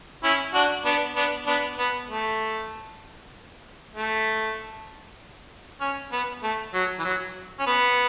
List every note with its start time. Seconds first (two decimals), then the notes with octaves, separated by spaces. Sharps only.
0.24 C#4 E4
0.54 D4 F#4
0.85 B3 D4
1.16 B3 D4
1.47 B3 D4
1.79 B3
2.09 A3
3.96 A3
5.81 C#4
6.12 B3
6.43 A3
6.74 F#3
6.99 E3
7.05 F#3
7.60 C#4
7.66 B3